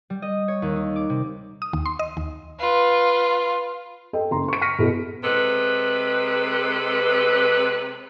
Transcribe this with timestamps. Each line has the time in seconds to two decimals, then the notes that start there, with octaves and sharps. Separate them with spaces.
0.10 G3
0.22 D#5
0.48 C#5
0.62 D#2
0.76 D#4
0.96 D6
1.10 C3
1.62 D#6
1.73 D#2
1.86 C6
1.99 D#5
2.17 D#2
2.59 F4 B4
4.13 A4 D#5 G5
4.31 F#1 A#5 C6
4.48 C#6 D7
4.61 C#6 F6 A#6 B6 C#7 D#7
4.79 B2 E4 G#4 A4
5.24 C3 G#3 A4 B4